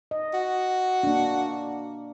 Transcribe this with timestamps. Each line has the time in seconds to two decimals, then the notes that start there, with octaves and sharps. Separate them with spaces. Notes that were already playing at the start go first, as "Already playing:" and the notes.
0.11 D#5
0.34 F#4
1.03 A#3 D4